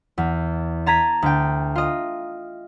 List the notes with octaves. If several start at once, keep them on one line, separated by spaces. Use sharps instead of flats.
E2
A5 A#5 G#6 B6 D#7
D2 G5
F4 D#5